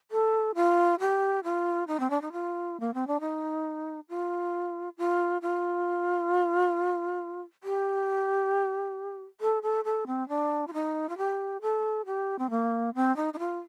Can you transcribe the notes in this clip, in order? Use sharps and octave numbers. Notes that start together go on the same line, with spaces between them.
A4
F4
G4
F4
D#4
C4
D4
D#4
F4
A#3
C4
D4
D#4
F4
F4
F4
G4
A4
A4
A4
C4
D4
F4
D#4
F4
G4
A4
G4
C4
A#3
C4
D#4
D#4
F4